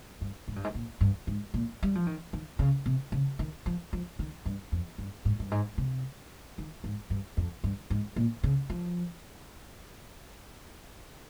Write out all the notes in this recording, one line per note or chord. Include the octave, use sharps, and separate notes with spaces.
G2
G#2
G2
G#2
A#2
G2
G#2
A#2
G3
F3
D#3
D#3
C#3
C3
C#3
D#3
F3
F3
D#3
G2
F2
G2
G#2
G2
G#2
C3
D#3
G#2
G2
F2
G2
G#2
A#2
C#3
F3